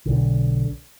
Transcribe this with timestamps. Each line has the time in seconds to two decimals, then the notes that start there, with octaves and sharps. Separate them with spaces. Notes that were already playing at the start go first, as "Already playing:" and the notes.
0.06 B1 D3